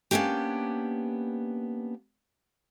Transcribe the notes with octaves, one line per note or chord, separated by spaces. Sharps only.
A#3 B3 C#4 D4 G4